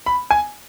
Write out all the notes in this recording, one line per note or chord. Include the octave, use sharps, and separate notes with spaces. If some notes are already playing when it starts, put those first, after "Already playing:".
B5
G#5